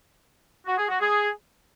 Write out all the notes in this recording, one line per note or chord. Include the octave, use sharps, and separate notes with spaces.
F#4
G#4
F#4
G#4